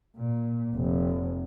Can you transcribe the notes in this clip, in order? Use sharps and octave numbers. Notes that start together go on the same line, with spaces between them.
A#2
F1